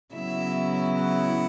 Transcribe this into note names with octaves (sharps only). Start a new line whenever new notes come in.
C#3 F#3 B3 E4 E5
F#5